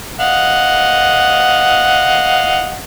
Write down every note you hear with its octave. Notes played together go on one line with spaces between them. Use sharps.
D#5 F5 F#5